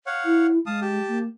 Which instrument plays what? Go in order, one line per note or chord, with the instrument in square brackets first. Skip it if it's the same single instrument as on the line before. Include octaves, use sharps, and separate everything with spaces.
[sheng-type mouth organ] C#5 F5 F#5
[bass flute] E4
[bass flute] G#3 [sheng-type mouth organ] F5 A5 D#6
[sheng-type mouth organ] G4 A5
[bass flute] A#3